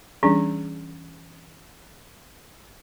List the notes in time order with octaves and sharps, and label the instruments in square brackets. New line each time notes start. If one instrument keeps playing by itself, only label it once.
[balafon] E3 C#4 [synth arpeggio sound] G3 D4 G#4